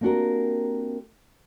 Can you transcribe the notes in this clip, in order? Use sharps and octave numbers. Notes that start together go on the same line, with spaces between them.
A#3 C4 D4 F#4 G4 A#4